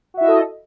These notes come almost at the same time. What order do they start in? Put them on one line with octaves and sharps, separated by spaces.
F#4 E5 E4 D#5 A4